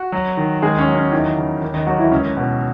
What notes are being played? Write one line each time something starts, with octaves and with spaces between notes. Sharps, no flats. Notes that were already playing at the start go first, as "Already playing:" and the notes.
Already playing: F#4
F#3
D#3
D#2 G#3 G#4
C#4
F#3
C#4
E2 D#3 D#4
C#3
D#2
D#3 D#4
D#2 F#3 F#4
E3 E4
C#2 C#4
B2